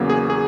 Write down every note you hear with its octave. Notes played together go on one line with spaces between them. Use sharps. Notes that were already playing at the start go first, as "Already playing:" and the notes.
Already playing: E2 C#3 F#3 A#3
G#4
G#4